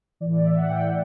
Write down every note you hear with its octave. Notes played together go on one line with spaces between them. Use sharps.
A2 E3 D5
D5
E5
F#5
A2 E3 G5